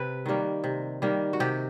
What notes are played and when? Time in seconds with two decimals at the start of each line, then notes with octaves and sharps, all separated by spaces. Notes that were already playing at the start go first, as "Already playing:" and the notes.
Already playing: C3 B4
0.26 D#3 G3 A#3
0.64 C3
1.02 D#3 G3 A#3
1.33 F#4
1.40 C3 G4